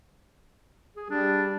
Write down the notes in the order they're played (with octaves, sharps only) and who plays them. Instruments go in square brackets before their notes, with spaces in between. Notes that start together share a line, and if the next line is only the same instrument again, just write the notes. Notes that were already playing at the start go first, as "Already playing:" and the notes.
[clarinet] G#4
[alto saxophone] G3 [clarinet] D4